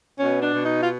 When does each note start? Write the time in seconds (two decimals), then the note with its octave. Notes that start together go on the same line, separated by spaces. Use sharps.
0.18 B2 C#4
0.42 D4
0.53 B2
0.65 D#4
0.82 F4